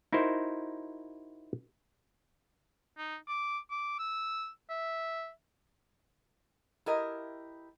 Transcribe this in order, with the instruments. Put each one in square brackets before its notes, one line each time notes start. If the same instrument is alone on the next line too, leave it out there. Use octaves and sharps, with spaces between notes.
[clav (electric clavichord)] D#4 E4 F#4 A#4 C5
[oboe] D#4
D6
D6
E6
E5
[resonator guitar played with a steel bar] E4 G4 A#4 D#5